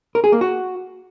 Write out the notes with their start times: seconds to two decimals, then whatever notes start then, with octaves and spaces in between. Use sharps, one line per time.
0.15 A#4
0.24 G#4
0.32 A#3
0.41 F#4